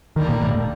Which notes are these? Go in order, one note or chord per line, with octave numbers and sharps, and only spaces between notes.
D#2 D3 D#3 G3 A#3
A#2
A2